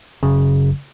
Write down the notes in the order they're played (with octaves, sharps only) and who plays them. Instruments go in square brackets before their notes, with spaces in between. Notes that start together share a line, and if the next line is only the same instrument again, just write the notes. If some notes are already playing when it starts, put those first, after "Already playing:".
[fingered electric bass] F#1 [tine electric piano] C#3